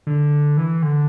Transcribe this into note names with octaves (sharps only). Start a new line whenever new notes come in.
D3
E3
D3